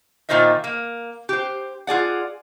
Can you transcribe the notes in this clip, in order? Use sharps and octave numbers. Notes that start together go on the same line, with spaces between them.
A#2 D#3 F4 C5 D#5 E5
A#3
G4 C5
F4 G#4 D5 F#5